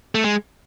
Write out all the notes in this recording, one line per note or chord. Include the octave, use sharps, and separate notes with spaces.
A3
G#3